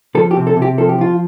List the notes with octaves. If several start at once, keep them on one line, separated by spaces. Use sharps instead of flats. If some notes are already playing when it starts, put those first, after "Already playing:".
F3 A4
G4
C3
A4
C3
G4
F3 A4
G4
F3 F4